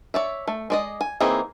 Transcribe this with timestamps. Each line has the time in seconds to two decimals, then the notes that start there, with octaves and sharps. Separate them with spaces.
0.14 C#5 D5 E5
0.48 A3
0.70 G#3 D5 D#5
1.01 G#5
1.20 E3 A#3 C4 D#4 G#4